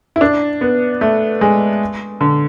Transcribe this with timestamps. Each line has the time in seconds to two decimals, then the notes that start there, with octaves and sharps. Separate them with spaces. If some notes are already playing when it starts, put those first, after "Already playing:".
0.16 E4
0.21 D4
0.61 B3
1.01 A3
1.41 G#3
2.21 D3